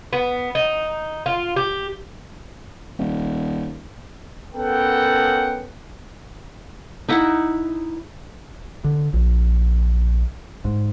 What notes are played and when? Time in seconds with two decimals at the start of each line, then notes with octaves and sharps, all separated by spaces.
0.13 B3
0.55 D#4
1.26 F4
1.56 G4
2.99 D#1
4.55 B3 C#4 A4 A#4 F#5 G5
7.09 D#4 E4 F#5
8.84 D3
9.13 A#1
10.65 G#2